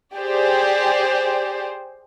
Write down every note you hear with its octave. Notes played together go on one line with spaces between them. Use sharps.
G4 G#4 C5 D5